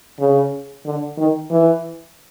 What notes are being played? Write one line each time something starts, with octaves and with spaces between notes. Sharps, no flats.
C#3
D3
D#3
E3